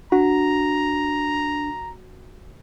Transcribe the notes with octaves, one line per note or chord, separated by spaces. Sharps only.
D4 F#4 A#5